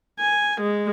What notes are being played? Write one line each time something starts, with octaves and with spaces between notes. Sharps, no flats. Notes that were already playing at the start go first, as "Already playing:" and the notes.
G#5
G#3